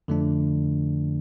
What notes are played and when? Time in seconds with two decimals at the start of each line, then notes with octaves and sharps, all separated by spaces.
0.08 F2 D3 F3 A3 D4